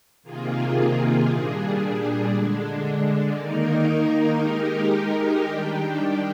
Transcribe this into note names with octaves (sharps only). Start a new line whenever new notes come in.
C3 D#3 A#3 F4 G#4
A#2 G3 D4 G#4
D3 G#3 D4
D#3 A#3 D#4 A#4
G#3 D#4 G4 A#4
D#3 G3 D4 G4